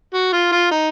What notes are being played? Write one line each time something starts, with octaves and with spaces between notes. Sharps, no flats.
F#4
F4
F4
D#4